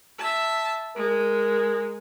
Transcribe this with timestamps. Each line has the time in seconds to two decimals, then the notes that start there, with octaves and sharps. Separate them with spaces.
0.19 E5 A5
0.97 G#3 A#4